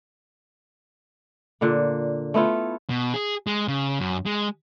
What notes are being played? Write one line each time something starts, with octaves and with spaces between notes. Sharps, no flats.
A#2 D3 A#3
A3 B3 E4 F4
B2
G#4
G#3
C#3
F#2
G#3